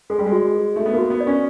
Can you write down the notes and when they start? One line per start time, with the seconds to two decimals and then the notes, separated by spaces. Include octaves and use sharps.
0.10 G#3 A4
0.19 G3
0.26 G#3
0.32 F#4
0.55 A4
0.76 A3 D#4
0.86 B3
0.93 A#3 F#4
1.10 B3
1.20 D5
1.27 C#4